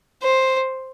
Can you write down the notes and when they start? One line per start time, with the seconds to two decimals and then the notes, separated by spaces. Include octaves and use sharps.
0.22 C5